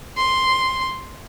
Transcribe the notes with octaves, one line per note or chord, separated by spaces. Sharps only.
C6